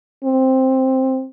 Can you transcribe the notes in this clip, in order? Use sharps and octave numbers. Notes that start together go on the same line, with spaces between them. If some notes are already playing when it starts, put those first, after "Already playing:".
C4